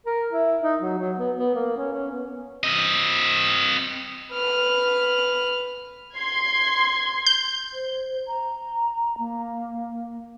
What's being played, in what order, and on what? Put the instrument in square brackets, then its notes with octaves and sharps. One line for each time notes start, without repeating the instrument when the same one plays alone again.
[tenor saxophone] A#4
E4
D#4
F#3
F#3
B3
B3
A#3
C#4
C#4
B3
[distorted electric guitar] C4 D#5
[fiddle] B4 F6
[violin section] C6 G#6 C7
[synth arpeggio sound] G6
[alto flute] C5
A#5
A#3